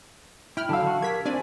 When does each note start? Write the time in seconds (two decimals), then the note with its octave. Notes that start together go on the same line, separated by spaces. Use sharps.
0.57 E4 G5 B5 F6
0.69 D3 F#3 F5 A5 E6
0.87 F#4
1.02 G4 A#4 G#6 B6
1.26 C4 D4 D5 G#5